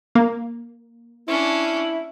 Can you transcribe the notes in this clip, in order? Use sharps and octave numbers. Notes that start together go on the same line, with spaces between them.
A#3
C#4 D4 E4